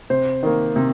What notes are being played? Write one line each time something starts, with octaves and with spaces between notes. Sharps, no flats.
C3 C5
D#3 A#3
C3